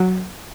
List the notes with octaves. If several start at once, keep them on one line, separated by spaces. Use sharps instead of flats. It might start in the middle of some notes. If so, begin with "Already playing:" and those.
Already playing: F#3